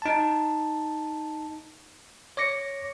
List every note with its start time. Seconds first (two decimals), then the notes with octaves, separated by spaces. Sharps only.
0.02 D#4 A5
2.37 C#5 D6 A#6 C#7